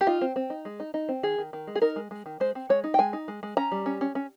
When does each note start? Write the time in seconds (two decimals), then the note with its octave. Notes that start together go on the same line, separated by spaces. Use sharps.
0.01 G4
0.07 D#4 F4
0.21 C4
0.36 C4
0.50 D#4
0.65 G#3
0.80 D#4
0.94 D#4
1.09 C4
1.23 D#3 G#4
1.38 D#3
1.53 D#3
1.67 G#3
1.75 G#4
1.82 D#4 A#4
1.96 G#3
2.11 G#3
2.26 D#3
2.40 G#3 C5
2.55 C4
2.69 G#3 C#5
2.84 D#4
2.94 G5
2.98 G#3 G#5
3.13 D#4
3.28 G#3
3.43 G#3
3.57 C#4 A#5
3.72 G3
3.86 C#4
4.01 C#4
4.15 C#4